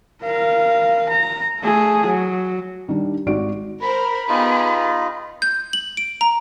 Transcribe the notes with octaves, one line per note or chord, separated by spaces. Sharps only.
A#4 F5
A#5
A3 G#4
F#3
D#3 G3 D4
G#1 G#2 F#4 D5 D7
A#4 C5 B5
B3 D#4 F4 G4 G#4
G6
F#7
D7
A#5